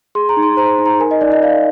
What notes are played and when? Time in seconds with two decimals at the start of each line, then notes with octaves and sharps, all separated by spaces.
0.15 G#4 C6
0.29 A#5
0.37 D#4
0.43 C6
0.57 C5 A#5
0.79 D#4
0.86 A#5
1.00 A#4 G#5
1.11 D#5
1.21 D#4 D5
1.32 D#5
1.43 D5 F5